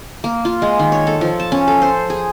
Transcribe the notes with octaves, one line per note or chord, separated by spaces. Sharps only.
A#3
F4
G#3
D#3
C#5
A4
F3
A5
C#4
A4
C5
G#4